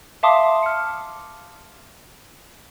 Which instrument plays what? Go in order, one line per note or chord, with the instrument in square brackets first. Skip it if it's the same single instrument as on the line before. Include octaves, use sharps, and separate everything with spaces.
[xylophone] E5 F5 A5 C6 D6 D#6
F6 C#7